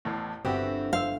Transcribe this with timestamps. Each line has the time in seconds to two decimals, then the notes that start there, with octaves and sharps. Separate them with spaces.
0.05 A1 E2 A2
0.45 G1 B3 C4 F#4 G4 E5
0.93 C5 F5 E6